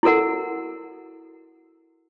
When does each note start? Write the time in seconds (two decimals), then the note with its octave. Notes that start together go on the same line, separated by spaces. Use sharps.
0.03 E4 F#4 A4 A#4 F#5